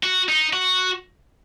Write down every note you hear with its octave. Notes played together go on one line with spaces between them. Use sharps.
F#4
D#4
F#4